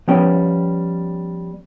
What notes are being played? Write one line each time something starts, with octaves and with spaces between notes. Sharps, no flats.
F3 G3 B3 C#4 G5